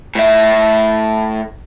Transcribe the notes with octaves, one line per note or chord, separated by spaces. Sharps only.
A2 E5